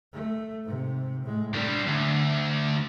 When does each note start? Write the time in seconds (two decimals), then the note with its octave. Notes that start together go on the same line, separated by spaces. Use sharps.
0.13 A3
0.64 G#2 C3
1.23 A2 G#3
1.54 G3 C4 D4
1.86 D2